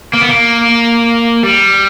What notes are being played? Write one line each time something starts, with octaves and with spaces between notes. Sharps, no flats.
A#3
B3
A#3
G3